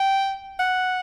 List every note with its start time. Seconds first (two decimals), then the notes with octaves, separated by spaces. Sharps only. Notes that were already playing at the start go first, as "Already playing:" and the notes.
Already playing: G5
0.59 F#5